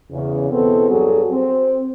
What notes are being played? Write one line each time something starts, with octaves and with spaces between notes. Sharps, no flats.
E2 C#3
E2 B2 B3 C4 A4
G2 F#3 F#4 G#4 A4
C4